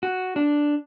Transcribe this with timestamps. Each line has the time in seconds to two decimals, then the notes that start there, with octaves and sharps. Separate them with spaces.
0.03 F#4
0.36 D4